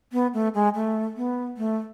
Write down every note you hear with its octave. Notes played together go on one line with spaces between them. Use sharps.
B3
A3
G#3
A3
B3
A3